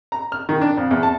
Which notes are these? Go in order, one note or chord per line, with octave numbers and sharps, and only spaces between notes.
A#5
F6
D#3
D4
F2
E2
A5